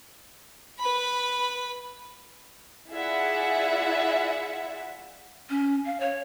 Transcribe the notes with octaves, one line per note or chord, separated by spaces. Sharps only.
B4 B5
E4 F4 G#4 D5 E5 F#5
C#4
F5
C#5